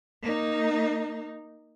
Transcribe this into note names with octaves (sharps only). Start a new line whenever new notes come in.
A#3 D#4